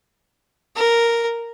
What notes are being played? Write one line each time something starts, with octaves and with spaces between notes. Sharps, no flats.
A#4